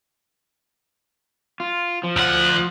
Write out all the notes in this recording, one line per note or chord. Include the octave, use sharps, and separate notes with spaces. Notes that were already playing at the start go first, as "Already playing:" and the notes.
F4
F3
D2 F#5